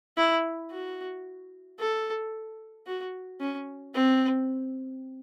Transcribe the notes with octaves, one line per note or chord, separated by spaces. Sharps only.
E4
F#4
A4
F#4
C#4
C4